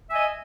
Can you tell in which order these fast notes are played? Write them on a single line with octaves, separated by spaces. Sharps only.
E5 G#5 D#5